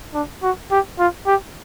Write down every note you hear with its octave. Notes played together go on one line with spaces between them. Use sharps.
D4
F#4
G4
F4
G4